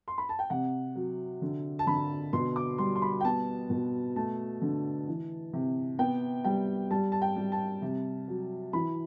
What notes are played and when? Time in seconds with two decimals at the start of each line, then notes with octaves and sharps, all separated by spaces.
0.08 C6
0.18 B5
0.29 A5
0.39 G5
0.50 C3 F#5
0.95 F#3
1.42 D3
1.79 A5
1.87 D3 B5
2.33 B2 C6
2.56 D6
2.78 G3 C6
2.96 C6
3.02 B5
3.21 G5
3.25 B3 A5
3.70 B2
4.16 A3 A5
4.62 D3
5.08 E3
5.53 C3
5.99 B3 G5
6.44 G3 G5
6.91 G3 A5
7.12 A5
7.22 G5
7.36 G3
7.52 A5
7.82 C3
8.28 F#3
8.73 E3 B5